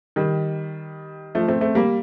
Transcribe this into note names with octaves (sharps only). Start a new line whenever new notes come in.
D#3 G3
F3 A3
A3 C4
A3 C4
G3 A#3